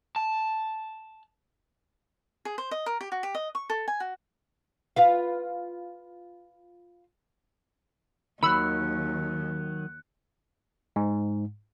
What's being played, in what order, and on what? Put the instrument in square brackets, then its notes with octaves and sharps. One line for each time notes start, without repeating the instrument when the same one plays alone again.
[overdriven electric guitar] A5
[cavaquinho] G#4
C5
D#5
A#4
G4
F#4
G4
D#5
C#6
A4
G#5
F#4
[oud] F4 B4 F5
[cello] D#2 [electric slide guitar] D#3 F#3 [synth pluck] B5 E6 [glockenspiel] F#6 C#7
[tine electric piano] G#2